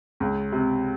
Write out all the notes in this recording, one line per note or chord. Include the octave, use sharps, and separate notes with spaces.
C#2
C3